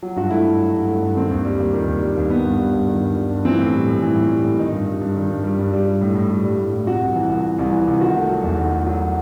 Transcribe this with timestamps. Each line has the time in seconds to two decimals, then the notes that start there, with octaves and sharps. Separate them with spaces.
0.03 F#3
0.16 G2 F#4
0.30 A3 E4
0.46 G2
0.59 F#3
0.74 G2
0.88 A3
1.02 G2
1.17 D#3 C4
1.31 D#2
1.45 G3
1.60 D#2
1.74 D#3
1.88 D#2
2.02 G3
2.17 D#2
2.30 D#3 B3
2.45 G2
2.59 G3
2.74 G2
2.88 D#3
3.02 G2
3.16 G3
3.31 G2
3.45 E3 C4
3.59 A2
3.74 G3
3.88 A2
4.02 E3
4.16 A2
4.30 G3
4.44 A2
4.59 D#3 D#4
4.73 G2
4.88 G3
5.01 G2
5.16 D#3
5.30 G2
5.44 G3
5.59 G2
5.73 G3
5.87 G3
6.01 A2
6.15 A2
6.31 G3
6.45 G3
6.58 A2
6.73 A2
6.86 C3 F#4
7.02 C2
7.16 E3
7.29 C2
7.44 C3
7.59 C2
7.72 E3
7.87 C2
8.01 D#3 F#4
8.15 A3
8.30 F#3
8.44 E2
8.59 D#3
8.72 A3
8.87 F#3